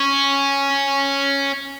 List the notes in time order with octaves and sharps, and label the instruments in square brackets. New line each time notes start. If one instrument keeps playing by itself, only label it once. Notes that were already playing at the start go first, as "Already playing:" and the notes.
Already playing: [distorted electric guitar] C#4